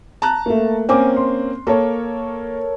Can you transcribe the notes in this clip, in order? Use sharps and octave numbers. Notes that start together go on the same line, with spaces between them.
A5 A#5 F#6
A3 A#3
A#3 C4 C#4 G5 G#5 D6
C6
A#3 A4 A#4 C#5